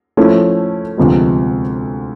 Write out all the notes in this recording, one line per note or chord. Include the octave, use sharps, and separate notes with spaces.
F3 A3 C#4 E4
D2 C3 F3 G#3 B3